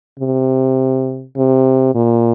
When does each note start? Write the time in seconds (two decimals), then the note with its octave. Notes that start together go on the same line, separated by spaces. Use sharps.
0.19 C3
1.37 C3
1.95 A#2